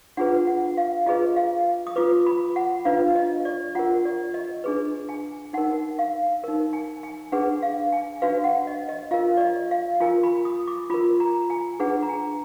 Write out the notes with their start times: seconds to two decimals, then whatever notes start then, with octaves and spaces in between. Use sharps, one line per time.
0.17 D4 F4 G#4 B4 F#5
0.47 F#5
0.77 F5
1.06 F4 G#4 B4 D#5
1.36 F5
1.87 D#6
1.96 F4 B4 D6
2.26 B5
2.56 F#5
2.85 D4 F4 B4 F5
3.15 D#5
3.45 D5
3.75 F4 A#4 F#5
4.05 D5
4.34 D#5
4.64 D4 G#4 B4
5.09 G#5
5.53 D#4 A#4 F#5
5.99 F5
6.44 D#4 A#4
6.73 G#5
7.03 G#5
7.32 D4 G#4 B4 F#5
7.62 F5
7.92 G#5
8.22 D4 F#4 B4 F5
8.44 F#5
8.67 D#5
8.89 D#5
9.11 F4 A#4 F5
9.37 D5
9.41 D#5
9.71 F5
10.00 F4 A#4 G#5
10.23 B5
10.45 D#6
10.68 D6
10.90 F4 A#4 B5
11.20 A#5
11.50 G#5
11.80 D4 G#4 B4 F#5
12.03 A#5
12.09 G#5